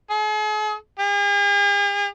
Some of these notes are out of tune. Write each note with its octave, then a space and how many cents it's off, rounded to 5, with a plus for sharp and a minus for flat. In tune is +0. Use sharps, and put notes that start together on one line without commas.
G#4 +45
G#4 -45